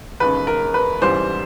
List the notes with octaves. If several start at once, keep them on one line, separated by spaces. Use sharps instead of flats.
E1 D#2 C#3 B4
A#4
B4
A1 G#2 E3 G3 C5